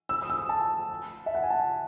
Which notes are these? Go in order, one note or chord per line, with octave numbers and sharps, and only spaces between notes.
E6
D#6
E6
A5
E5
F#5
G#5
A5